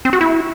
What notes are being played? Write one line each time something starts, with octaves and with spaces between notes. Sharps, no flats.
C4
F#4
E4